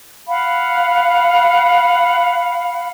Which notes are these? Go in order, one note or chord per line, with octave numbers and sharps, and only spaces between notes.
F5 F#5 B5